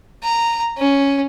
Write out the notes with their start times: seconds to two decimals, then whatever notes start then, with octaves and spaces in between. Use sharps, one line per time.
0.23 A#5
0.78 C#4